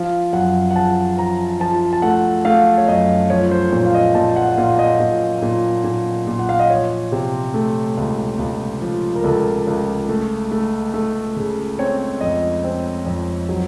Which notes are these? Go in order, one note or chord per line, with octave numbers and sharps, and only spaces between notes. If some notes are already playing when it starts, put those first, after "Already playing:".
Already playing: F3 F5
F#2 F#5
F#5
F3 A5
F3 A#5
F3 A5
A5
A3 F#5
A3 F5
C#5
F#2 D#5
F3 C#5
C5
A#2 C#5
F5
D#5
A#2 A5
F#5
A#2 F5
D#5
A#2
A#2
A#2
A#2
F#5
F5
D#5
F3 C#5
C3
A3
C#2
C#2
F3
A#4
C#2 A4
C#2
A3
A3
A3
C#3
C4 C#5
F2 D#5
C4
F2
F#3